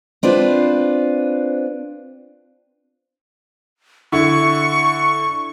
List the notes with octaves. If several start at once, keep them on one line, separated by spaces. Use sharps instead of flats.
C4 D4 F4 B4 C5
D3 E4 C#6